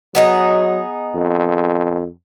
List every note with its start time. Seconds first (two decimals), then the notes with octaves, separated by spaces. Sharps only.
0.15 F#3 B3 D#4 G#4
1.15 F2